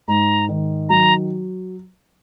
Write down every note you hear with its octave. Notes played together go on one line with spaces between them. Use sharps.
G#2 A#5
D#3
F#3 A#5